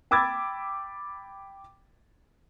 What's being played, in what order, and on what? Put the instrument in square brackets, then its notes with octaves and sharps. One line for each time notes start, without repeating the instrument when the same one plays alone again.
[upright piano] G5 B5 D6 E6 G#6 A6